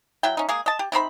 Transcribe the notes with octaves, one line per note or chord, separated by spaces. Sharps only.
F#3 E4 G5
C#4 D#4
G#3 A#3 G#4
D#5 A5
G4
C3 D#4 C5 B5